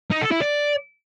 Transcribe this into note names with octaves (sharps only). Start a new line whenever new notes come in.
D#4
A4
E4
D5